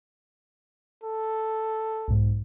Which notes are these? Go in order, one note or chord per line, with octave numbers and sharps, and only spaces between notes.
A4
B1 G#2